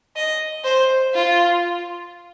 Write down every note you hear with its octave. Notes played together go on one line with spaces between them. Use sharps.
D#5
C5
F4